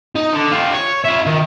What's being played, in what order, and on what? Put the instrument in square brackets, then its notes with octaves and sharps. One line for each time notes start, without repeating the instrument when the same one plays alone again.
[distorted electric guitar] D#4
D3
F4 G4
C#5
F4 E5
D#3